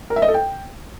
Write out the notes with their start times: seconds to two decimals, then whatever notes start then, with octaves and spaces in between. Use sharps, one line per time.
0.10 A#4
0.16 E5
0.22 D#5
0.28 A4
0.34 G5